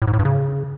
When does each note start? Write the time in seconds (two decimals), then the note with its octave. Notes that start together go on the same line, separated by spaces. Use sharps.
0.02 A2
0.07 G#2
0.13 A2
0.19 G2
0.25 C#3